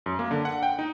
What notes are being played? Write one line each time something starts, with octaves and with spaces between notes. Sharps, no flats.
F#2
A#3
D3
F#5
G5
D#4